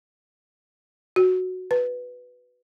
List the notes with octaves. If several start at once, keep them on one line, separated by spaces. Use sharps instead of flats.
F#4
B4